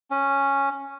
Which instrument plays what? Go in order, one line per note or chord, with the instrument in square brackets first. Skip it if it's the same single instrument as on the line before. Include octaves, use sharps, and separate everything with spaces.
[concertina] C#4